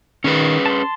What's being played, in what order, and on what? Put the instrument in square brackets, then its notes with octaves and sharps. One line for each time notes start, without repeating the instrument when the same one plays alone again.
[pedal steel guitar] D#3 [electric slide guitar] C#4 G#4 B4
[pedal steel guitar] A5 C6